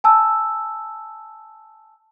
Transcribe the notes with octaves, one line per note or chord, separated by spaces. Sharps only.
G#5 A5 E6